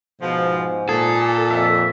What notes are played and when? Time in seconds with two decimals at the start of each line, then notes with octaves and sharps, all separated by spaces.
0.21 G#2 B2 F3
0.89 A#2 G#4 A4
1.51 F2 E5